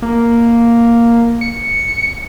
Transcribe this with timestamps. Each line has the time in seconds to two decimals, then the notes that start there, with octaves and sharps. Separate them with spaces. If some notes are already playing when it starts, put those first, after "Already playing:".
0.02 A#3
1.41 C#7